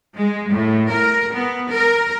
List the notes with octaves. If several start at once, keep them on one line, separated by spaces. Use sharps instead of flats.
G#3
A2
A#4
B3
A#4